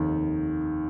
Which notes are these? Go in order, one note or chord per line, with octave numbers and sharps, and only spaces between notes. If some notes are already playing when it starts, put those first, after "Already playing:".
Already playing: F1 D#2 D#3